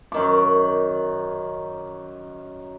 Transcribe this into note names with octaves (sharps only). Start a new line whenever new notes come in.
F#2 D#3 D6